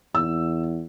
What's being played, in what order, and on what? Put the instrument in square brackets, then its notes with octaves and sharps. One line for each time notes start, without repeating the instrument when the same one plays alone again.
[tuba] E2 [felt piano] E6